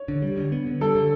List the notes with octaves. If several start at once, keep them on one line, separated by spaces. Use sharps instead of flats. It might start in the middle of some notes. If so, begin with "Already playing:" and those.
Already playing: C#5
D3
G3
D3
B3
D3
G3 A4
D3